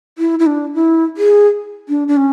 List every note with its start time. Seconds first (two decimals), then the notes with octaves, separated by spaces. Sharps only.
0.18 E4
0.39 E4
0.46 D4
0.75 E4
1.17 G#4
1.89 D4
2.08 D4
2.17 C#4